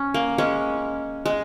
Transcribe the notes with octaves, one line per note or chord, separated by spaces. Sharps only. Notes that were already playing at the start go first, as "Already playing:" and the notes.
Already playing: C#4
A#3
G#3 C#4
G#3